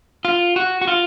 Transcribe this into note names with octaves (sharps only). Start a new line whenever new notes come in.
F4
F#4
F#4
F4